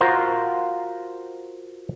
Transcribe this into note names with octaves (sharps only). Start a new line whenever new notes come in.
F4 F#4 A#4 C5